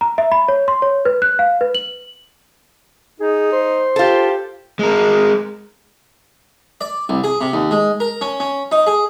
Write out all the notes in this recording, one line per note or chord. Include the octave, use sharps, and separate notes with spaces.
A#5
E5
B5
C#5
C6
C#5
B4
F#6
F5
B4
F#7
D#4 G#4
C5
F4 G4 A4
G#3 A#4
D5
C2
G#4
C3
D#2
G#3
A#4
C#4
C#4
D#4
G#4